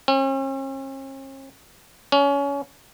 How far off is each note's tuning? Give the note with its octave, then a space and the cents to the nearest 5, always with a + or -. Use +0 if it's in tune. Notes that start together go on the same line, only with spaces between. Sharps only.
C#4 -45
C#4 +25